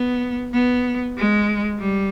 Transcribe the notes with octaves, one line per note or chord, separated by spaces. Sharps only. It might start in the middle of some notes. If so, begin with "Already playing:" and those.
Already playing: B3
B3
G#3
G3